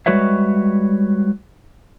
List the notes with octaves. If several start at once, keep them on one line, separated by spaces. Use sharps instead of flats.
G3 G#3 F#4 B4 C#5 E5